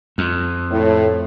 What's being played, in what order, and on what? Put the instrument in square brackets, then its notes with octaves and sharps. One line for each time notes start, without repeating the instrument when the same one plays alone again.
[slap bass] F2
[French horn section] A2